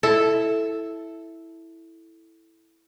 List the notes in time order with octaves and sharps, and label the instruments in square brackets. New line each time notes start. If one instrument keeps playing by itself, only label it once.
[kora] E4 A4